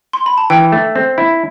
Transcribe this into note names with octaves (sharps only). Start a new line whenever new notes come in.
C6
B5
A5
E3 G5
A3
C4
E4